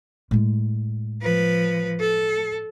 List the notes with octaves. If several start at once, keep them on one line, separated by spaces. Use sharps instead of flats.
A2 G#3
F3 B4
A4